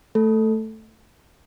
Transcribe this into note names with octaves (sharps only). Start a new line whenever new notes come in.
A3 A4